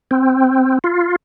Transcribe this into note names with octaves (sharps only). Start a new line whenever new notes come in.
C4
F4